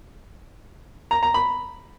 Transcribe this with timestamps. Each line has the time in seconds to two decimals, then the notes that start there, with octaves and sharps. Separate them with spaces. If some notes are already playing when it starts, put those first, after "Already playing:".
1.11 A#5
1.23 A#5
1.34 B5